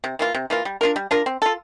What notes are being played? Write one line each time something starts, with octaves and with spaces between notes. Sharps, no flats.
C3
E3 A#3 F4
C3
E3 A#3 F4
G3
D4 F4 A#4
G3
D4 F4 A#4
C4
F4 A4